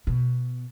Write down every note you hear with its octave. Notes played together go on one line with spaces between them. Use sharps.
B2